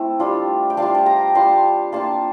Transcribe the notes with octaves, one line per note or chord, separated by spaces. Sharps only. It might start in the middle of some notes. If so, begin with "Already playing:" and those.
Already playing: A3 C4 E4
G3 D4 F4
G5
G3 D4 F4 F5 A5
A5
G5 A#5
G3 D4 F4 A5 C6
A#3 D4 F4 A5 C6